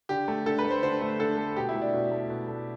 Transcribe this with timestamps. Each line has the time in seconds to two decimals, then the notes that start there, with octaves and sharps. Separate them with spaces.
0.09 D3 G4
0.28 A3
0.46 D3 A4
0.59 B4
0.65 A3
0.71 C5
0.83 D3 C5
1.02 A3
1.20 D3 A4
1.38 A3
1.56 B2 G4
1.69 E4
1.75 A3
1.81 D4
1.93 B2
2.12 A3
2.30 B2
2.48 A3